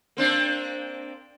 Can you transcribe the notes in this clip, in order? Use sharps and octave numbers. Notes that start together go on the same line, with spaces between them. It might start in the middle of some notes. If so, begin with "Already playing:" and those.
A#3 C4 D4